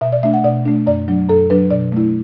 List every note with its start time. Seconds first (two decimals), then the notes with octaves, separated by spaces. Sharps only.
0.01 B2 E5
0.12 D5
0.23 A3 D4 E5
0.34 F#5
0.44 B2 D5
0.65 A3 D4
0.87 F#2 D5
1.08 F#3 D4
1.29 F#2 A4
1.50 F#3 D4 B4
1.71 B2 D5
1.92 A3 E4